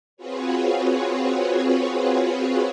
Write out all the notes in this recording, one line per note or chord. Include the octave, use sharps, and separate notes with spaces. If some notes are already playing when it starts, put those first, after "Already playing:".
C4 F4 F#4 G#4 B4 C#5